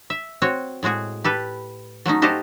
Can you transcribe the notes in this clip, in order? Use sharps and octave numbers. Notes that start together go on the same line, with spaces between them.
E5
C4 F#4 C#5
A2 G#3 F#4 G#4
G4 A4 B4
F#3 A3 C#4 D#4
F#4 G4 A4 C5 D#5 F5